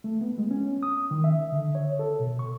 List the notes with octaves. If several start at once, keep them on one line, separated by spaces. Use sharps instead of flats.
A3
B3
G#3
C#4
D#6
D#3
E5
D3
C#5
A4
B2
C#6